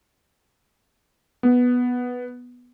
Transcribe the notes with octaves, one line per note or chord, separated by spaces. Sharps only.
B3